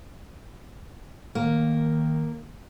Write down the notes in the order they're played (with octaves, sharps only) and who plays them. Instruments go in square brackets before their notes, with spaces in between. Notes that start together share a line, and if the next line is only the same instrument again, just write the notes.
[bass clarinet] D#3 [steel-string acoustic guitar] A#3